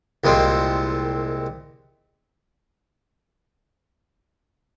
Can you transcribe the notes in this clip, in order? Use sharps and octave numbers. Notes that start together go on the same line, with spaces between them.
C2 A#2 G#3 C4